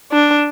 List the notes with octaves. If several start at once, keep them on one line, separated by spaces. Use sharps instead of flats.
D4